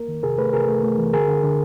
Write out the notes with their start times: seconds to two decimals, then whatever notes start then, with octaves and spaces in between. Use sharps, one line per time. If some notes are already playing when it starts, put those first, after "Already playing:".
Already playing: A#3 A#4
0.08 D#3
0.23 C3 G#4 A#4
0.38 A3 A4 B4
0.53 C3 G#4 A#4
0.68 A3
0.83 A3
0.98 E3
1.13 D3 G#4 A#4
1.28 D3
1.43 D3